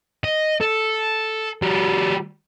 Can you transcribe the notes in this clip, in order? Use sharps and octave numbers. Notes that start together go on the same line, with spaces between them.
D#5
A4
G3 F#4